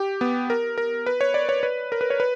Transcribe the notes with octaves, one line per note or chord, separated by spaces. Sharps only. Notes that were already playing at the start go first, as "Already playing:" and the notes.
Already playing: G4
B3
A#4
A#4
B4
C#5
D5
C#5
B4
A#4
B4
C#5
B4